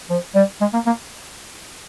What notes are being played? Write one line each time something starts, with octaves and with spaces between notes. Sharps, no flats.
F3
G3
G#3
A#3
A#3